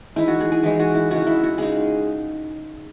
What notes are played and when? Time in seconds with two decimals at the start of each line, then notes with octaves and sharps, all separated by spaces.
0.16 E3 G#3 D#4 E4
0.28 F#4
0.40 G#4
0.52 G#4
0.63 E3 G#3 D#4
0.79 F#4
0.95 E4
1.11 C#3 G#3 D#4 F#4
1.27 E4
1.43 F#4
1.58 C#3 G#3 D#4 G#4